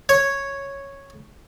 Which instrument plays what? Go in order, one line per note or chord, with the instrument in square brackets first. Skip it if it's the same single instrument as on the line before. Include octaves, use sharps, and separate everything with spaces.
[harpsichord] C#5